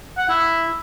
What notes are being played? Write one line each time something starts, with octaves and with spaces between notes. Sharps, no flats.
F#5
E4